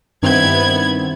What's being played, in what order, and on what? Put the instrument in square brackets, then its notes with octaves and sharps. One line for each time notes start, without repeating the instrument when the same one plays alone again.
[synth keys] G2 D#3 C4 [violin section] B3 E4 G#6